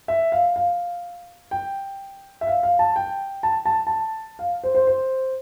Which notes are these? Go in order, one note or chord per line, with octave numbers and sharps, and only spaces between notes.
E5
F5
F5
G5
E5
F5
F5
A5
G5
A5
A5
A5
F5
C5
C5
C5